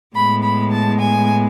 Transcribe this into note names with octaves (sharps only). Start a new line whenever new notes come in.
A2 G#3 B3 B5
B5
A5
G#5